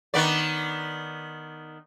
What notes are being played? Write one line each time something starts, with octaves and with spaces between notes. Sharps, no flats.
D#3 B3 D5